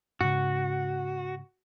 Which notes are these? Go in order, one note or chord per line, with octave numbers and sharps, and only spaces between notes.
G#2 C#3 F#4